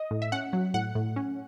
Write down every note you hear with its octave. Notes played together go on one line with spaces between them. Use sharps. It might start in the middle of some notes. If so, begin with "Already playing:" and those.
Already playing: D#5
A2
E5
C#4 F#5
F#3
A2 F#5
A2
C#4